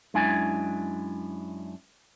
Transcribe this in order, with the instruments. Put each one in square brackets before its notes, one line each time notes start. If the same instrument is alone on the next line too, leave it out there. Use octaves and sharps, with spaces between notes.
[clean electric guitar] F#2 G#3 D4 E4 G#5